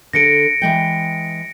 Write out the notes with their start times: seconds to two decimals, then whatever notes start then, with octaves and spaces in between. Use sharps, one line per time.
0.13 D3 A4 A#6 C#7 D7
0.62 E3 G#3 G5